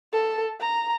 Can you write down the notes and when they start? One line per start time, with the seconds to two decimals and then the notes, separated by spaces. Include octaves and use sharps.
0.13 A4
0.60 A#5